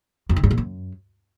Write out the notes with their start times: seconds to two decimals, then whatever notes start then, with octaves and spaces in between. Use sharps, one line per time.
0.29 F2
0.36 D#3
0.44 G2
0.51 A#2
0.58 F#2